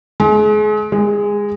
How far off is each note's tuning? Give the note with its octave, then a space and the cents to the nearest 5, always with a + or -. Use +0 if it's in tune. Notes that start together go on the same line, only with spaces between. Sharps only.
G#3 +35
G#3 -15